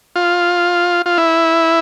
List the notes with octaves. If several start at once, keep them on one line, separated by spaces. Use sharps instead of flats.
F4
F4
E4